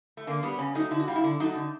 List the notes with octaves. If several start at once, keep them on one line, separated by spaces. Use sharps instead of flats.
A3
D3 A#3
G3 B3
C#3 C#4
F#3 A3 D#4
D3 E4
F#4
G3 F4
E4
D3
F#3 A3 D#4
D3